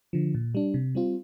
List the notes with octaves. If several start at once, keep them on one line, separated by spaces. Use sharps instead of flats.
D3 F3
A#2
G3 D4
C3
G3 C4 F4